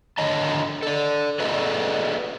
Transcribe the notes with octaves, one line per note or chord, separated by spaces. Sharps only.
D3 D#3 C#5 D#5 A5
A4 D5
F#4 G#4 A4 B4 D5 D#5